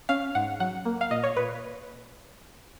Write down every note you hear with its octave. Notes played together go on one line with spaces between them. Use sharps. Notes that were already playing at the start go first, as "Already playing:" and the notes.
C#4 F5
G#2 F#5
F#3 F#5
A#3
F5
A#2 D#5
C#5
A#2 B4